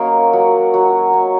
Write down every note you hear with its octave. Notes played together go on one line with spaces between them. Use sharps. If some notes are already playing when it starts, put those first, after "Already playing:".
Already playing: F#3 A#3 C#4 A#4 D#5
F#3
F#3
C#4